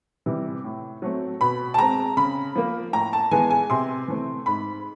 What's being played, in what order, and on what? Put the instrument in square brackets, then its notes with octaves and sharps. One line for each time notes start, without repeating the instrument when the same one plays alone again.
[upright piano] C3 E3 G3
A2
F#3 A3 C4
B2 B5
A5
G#3 C4 A#5
C#3 B5
F3 A#3
A2 A#5
A5
E3 G#3 B3 G#5
G#5
C3 C6
E3 A3 C4
G#2 B5